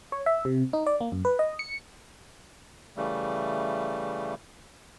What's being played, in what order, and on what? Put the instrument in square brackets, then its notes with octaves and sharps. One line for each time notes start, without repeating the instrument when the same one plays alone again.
[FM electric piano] C#5
E5
C3
D#4
D5
A#3
F#2
B4
D#5
C#7
[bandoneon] C#3 E3 G3 A3